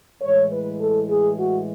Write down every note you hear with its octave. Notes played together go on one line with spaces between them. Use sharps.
A2 E3 G#3 C#5
B4
A4
G#4
F#4